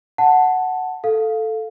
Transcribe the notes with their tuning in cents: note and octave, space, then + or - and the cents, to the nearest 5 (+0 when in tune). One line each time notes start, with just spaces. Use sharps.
F#5 +0 A5 +0
A4 +0 F5 +5